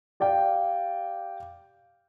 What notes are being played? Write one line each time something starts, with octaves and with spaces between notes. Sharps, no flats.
G4 D5 F5 G5